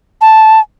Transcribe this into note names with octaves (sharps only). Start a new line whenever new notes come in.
A5